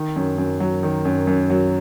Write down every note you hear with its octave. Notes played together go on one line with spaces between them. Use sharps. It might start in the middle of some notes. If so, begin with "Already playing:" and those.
Already playing: D#3
F#2
F#2
F#3
D#3
F#2
F#2
F#3